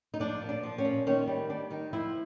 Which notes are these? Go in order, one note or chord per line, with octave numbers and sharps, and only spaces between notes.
D#4
F3 D4
A#2
D4
F3
C#4
A#2
D#3 C#4
G3
G3 D4
D#3 D#4
F3 E4